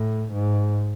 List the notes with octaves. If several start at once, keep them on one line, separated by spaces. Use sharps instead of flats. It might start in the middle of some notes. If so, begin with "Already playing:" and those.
Already playing: A2
G#2